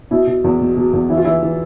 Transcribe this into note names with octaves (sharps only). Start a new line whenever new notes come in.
B2 E4
B2
E2
B2
B2
E2
E3 E4
F4
E3 E4
E3